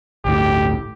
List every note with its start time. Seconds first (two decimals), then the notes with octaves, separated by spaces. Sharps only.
0.25 G1 D2 A2 G4